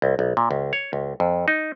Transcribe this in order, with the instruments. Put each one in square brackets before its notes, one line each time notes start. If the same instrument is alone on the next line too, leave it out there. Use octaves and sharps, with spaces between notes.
[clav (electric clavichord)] C2
B1
A#2
C#2
C#5
C#2
F2
D#4